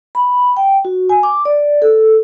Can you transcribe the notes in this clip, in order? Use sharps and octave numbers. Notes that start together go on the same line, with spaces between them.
B5
G5
F#4
G#5
D6
D5
A4